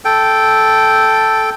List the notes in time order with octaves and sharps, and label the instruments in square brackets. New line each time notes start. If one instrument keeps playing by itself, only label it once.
[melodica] A4 G5